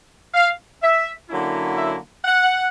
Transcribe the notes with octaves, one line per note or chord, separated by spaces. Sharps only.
F5
E5
D3 F#3 A#3 C#4 E4
E5
F#5